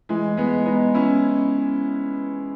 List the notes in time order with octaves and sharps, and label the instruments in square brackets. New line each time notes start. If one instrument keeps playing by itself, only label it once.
[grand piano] E3 G#3
G#3 B3
B3 D#4
C#4 E4